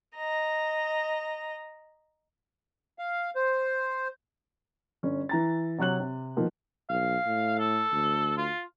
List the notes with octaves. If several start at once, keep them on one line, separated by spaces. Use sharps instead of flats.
D#5 A#5
F5
C5
G1 C#4
E3 A#5 A6
C3 F#3 C#5 F#6 F#7
C3
B2 D#3 F3 A#3
B1 F5
A2
A4
D2
F4